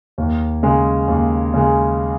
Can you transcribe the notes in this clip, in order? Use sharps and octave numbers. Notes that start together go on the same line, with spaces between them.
D#2
C#3 G#3
D#2
C#3 G#3